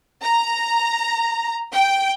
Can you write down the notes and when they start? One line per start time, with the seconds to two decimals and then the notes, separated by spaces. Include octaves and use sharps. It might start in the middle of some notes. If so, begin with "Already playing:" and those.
0.22 A#5
1.72 G5